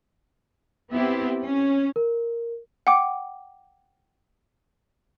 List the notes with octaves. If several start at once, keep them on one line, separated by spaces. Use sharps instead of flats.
B3 C4 E4 G4
C#4
A#4
F#5 G5 D6